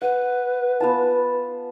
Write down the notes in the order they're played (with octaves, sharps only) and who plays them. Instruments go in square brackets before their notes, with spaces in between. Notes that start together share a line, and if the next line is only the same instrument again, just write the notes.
[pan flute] B4 [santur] F#5
[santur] B3 F4 A5